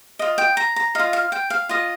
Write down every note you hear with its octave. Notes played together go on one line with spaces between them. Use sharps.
F4 D#5
G5
A#5
A#5
F4 D#5 F5
F5
G5
F5
F4 D#5